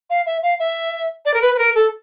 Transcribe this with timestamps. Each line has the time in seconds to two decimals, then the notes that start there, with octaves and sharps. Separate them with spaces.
0.10 F5
0.26 E5
0.43 F5
0.59 E5
1.25 D5
1.34 A#4
1.42 B4
1.54 B4
1.58 A#4
1.75 A4